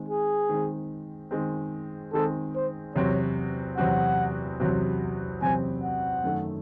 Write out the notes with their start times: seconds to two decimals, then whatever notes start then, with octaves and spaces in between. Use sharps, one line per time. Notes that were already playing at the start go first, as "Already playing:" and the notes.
Already playing: D#3 G#3 C4
0.09 G#4
0.49 D#3 G#3 C4
1.31 D#3 G#3 C4
2.13 D#3 G#3 C4 A4
2.55 C5
2.95 E2 C3 F#3 C4 F#4 C#5
3.77 E2 C3 F#3 C4 F#4 F#5
4.60 E2 C3 F#3 C4 F#4
5.41 E2 C3 F#3 C4 F#4 G#5
5.83 F#5
6.24 F#2 D#3 A3